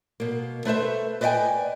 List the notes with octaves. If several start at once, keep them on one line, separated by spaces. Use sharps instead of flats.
B2 A#3
A3 B4 C5 E5
B4 D5 D#5 F5 G5 G#5